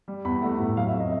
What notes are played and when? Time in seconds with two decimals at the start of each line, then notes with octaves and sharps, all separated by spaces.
0.08 G3
0.25 E2 B5
0.42 A3 F#5
0.60 A2
0.77 F#3 F5
0.88 E5
0.94 F2
1.00 D#5